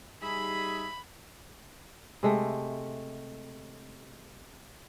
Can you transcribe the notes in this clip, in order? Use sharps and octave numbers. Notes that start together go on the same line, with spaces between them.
G3 D#4 G#4 E5 B5
C3 G#3 A3